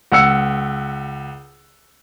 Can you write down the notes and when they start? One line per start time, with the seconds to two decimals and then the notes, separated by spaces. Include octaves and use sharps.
0.12 C#2 F#5 E6 C#7